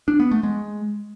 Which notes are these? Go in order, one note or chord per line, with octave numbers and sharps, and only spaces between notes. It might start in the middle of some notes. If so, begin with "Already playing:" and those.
D4
B3
A3
G#3